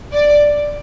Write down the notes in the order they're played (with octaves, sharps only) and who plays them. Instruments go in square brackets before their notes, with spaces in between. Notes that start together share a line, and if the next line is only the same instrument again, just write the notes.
[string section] D5